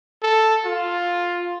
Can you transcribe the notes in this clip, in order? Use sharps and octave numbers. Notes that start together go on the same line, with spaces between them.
A4
F4